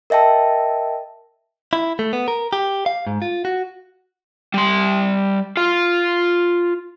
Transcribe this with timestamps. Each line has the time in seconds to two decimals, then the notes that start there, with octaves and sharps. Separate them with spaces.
0.10 A#4 D#5 E5 G5 A5
1.73 E4
1.99 A3
2.13 B3
2.28 A#4
2.53 G4
2.86 F5
3.07 G#2
3.22 F4
3.45 F#4
4.54 G3 C6
5.57 F4 F5